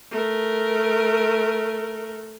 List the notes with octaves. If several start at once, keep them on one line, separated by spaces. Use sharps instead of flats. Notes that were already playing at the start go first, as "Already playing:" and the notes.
A3 A#4